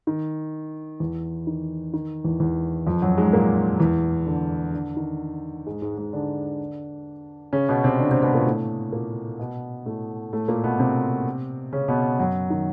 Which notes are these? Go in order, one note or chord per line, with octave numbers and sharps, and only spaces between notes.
D#3
E2 E3
D#3
D#3
E2 E3
E2 E3
F2 F3
F#2 F#3
G#2 G#3
A#2 A#3
E2 E3
D3
D3
D#3
G#2 G#3
G#2 G#3
G#2 G#3
D3 D4
C#3 C#4
B2 B3
C3 C4
D3 D4
C3 C4
B2 B3
A#2 A#3
A2 A3
A#2 A#3
B2 B3
A2 A3
A2 A3
A#2 A#3
B2 B3
C3 C4
C#3 C#4
B2 B3
F#2 F#3
D#3